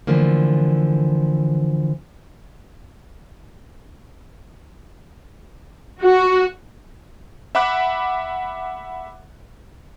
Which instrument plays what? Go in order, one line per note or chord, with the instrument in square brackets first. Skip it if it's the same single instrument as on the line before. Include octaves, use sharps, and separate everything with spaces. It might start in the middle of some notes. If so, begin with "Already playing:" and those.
[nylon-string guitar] D3 E3 F3 A3 A#3
[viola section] F#4
[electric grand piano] E5 F#5 B5 D6 F#6